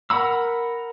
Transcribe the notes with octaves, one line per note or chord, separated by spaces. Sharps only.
A#4 F#5 B5 E6